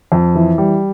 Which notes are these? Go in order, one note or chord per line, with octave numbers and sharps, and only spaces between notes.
F2
E3
G3